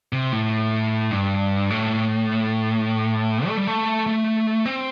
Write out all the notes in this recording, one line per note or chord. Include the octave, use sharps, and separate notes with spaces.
C3
A2
G2
A2
A3
G3
A3
A3
C4